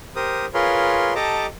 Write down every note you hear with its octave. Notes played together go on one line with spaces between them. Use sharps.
G4 A#4 C5 D#6
F4 G#4 A#4 B4 C#5 C6
G4 A4 D#5 A5 A#5 D6